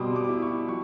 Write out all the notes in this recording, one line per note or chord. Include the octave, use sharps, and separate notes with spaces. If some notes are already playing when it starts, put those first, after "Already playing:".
Already playing: B2 G3 C4 C6 D6 D#6
D6
E4
C#6
F3 C#6